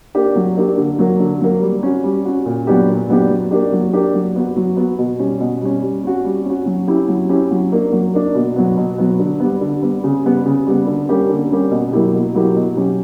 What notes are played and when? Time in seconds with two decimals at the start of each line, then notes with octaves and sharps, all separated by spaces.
0.15 A#3 D4 G4
0.36 F#3
0.56 A#3 D4 G4
0.77 D3
0.99 F#3 A#3
1.20 D3
1.41 F#3 A#3
1.62 G3
1.83 C#4 F#4
2.04 G3
2.25 C#4 F#4
2.46 A#2
2.67 F#3 B3 D4 G4
2.88 A#2
3.09 F#3 B3 D4 G4
3.30 F#3
3.51 A#3 D4 G4
3.72 F#3
3.93 A#3 D4 G4
4.14 F#3
4.36 B3 F#4
4.56 F#3
4.77 B3 F#4
4.98 B2
5.19 G3 C#4
5.40 B2
5.61 G3 C#4
5.82 G3
6.04 C#4 F#4
6.25 G3
6.45 C#4 F#4
6.66 F#3
6.87 C#4 E4 G4
7.08 F#3
7.29 C#4 E4 G4
7.51 F#3
7.72 A#3 D4
7.92 F#3
8.14 A#3 D4
8.35 B2
8.56 F#3 B3
8.77 B2
8.98 F#3 B3
9.19 D3
9.40 G3 B3
9.61 D3
9.82 G3 B3
10.04 C#3
10.24 G3 B3
10.46 C#3
10.67 G3 B3
10.87 D3
11.09 G3 A#3 C#4 G4
11.29 D3
11.51 G3 A#3 C#4 G4
11.71 B2
11.92 F#3 A#3 E4 G4
12.13 B2
12.34 F#3 A#3 E4 G4
12.56 B2
12.76 F#3 C#4 G4